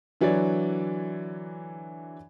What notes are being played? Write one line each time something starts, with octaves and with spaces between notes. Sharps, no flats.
D3 E3 F#3 C#5 D5